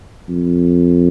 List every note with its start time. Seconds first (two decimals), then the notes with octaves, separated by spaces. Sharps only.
0.29 F2